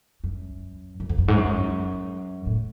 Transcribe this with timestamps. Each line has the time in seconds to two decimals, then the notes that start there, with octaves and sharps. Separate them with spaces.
0.24 F#2
1.00 F#2
1.09 F2
1.18 F#2
1.28 G#2
1.38 F#2
2.47 A2